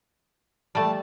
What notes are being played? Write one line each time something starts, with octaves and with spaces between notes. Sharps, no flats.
G3 A3 A5